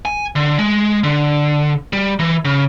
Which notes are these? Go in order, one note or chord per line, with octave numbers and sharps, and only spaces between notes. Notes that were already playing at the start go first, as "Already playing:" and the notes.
G#5
D3
G#3
D3
G3
E3
C#3